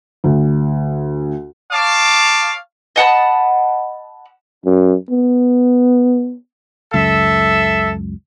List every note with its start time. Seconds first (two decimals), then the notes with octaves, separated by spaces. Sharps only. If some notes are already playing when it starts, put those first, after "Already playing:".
0.24 D2
1.71 C#5 F5 A5 D6
2.96 D#5 F#5 A5 B5
4.65 F#2
5.10 B3
6.94 C#2 F#2 A4 E5